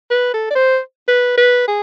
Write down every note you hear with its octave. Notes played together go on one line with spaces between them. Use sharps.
B4
A4
D5
C5
B4
B4
G#4